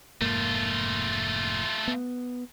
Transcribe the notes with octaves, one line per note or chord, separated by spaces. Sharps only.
F1 G#2 A3 A#3 F4
B3